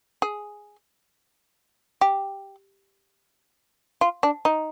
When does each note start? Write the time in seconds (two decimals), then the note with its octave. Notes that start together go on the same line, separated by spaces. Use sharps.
0.22 G#4
2.01 G4
4.01 F4
4.23 D4
4.45 D#4